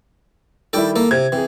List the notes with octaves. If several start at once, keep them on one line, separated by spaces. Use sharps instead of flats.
D#3 G3 E4 A4 D5 G5
A#3 A4
C3 G#6
E3 C4 G#4